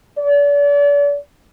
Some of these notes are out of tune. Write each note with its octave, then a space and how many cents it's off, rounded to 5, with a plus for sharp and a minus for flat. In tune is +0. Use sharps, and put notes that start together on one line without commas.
D5 -40